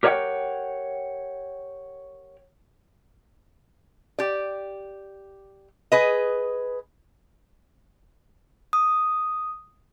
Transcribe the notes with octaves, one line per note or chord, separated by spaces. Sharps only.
G4 A#4 C#5 D#5 F#5 G5
G4 D5
G#4 B4 D#5
D#6